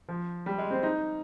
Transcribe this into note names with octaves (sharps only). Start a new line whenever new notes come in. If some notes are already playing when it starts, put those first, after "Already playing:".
F3
G3
G#3
C4
D#4